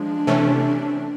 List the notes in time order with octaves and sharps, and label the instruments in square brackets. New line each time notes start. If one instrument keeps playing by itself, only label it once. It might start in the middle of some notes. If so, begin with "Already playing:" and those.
Already playing: [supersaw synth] F3 G#3 [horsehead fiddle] D4
[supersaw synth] C3 E3 A3 C#4